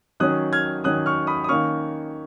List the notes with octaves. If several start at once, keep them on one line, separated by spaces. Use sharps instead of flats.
D#3 F#3 C#4 D#6 F#6
F6 G#6
D#3 F#3 C#4 D#6 F#6
C#6 F6
B5 D#6
D#6
D#3 A#3 C#4 C#6 F6